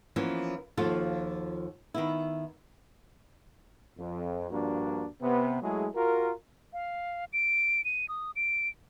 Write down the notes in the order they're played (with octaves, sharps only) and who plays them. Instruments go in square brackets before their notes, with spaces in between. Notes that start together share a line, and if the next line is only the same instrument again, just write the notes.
[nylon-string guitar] E3 F3 A#3 B3 C#4
D#2 F3 F4 F#4 A4 F5
D#3 B3 E4
[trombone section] F2
G2 F3 A#3 D4 F#4
C3 B3
F#3 G#3 A3 E4 G#4
F4 F#4 A#4
[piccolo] F5
D7
D#7
D#6
D7